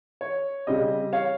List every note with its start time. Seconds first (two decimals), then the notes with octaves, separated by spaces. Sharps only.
0.21 C#5
0.67 C#3 G3 C4 D#5
1.13 C#5 F5